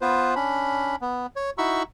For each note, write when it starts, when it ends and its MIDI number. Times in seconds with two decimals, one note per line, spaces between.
0.01 0.34 59
0.01 0.34 65
0.01 0.34 71
0.01 0.34 72
0.35 0.96 61
0.35 0.96 62
0.35 0.96 83
1.02 1.26 59
1.36 1.50 73
1.58 1.83 63
1.58 1.83 64
1.58 1.83 66
1.58 1.83 83
1.58 1.83 85
1.58 1.83 88